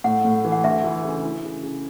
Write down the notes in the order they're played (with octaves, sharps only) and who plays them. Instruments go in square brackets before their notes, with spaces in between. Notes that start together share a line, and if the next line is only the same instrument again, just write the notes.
[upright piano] A2 [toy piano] F#5
[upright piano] A2
E3
[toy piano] F#5
[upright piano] D2 [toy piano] E5
[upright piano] E3
C#3
E4
C#3
C#3